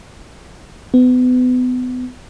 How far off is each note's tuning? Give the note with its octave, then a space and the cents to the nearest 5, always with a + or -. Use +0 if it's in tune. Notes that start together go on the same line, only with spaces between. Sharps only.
B3 +30